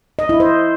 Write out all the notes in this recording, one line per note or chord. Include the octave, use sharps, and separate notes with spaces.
D#5
E4
C5